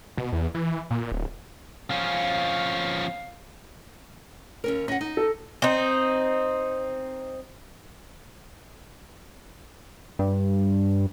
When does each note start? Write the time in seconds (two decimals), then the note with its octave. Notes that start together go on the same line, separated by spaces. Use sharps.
0.18 B2
0.32 E2
0.55 E3
0.91 A#2
1.12 D1
1.91 F3 C#4 F5
4.64 D#2 C#4 A#4
4.88 C#4 F#5 A#6
5.01 D#4
5.17 A4
5.62 C4 D#4
10.19 G2